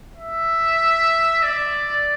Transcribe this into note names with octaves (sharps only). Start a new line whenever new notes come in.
E5
D5